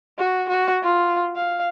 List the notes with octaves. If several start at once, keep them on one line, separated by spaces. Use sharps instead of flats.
F#4
F#4
F4
F5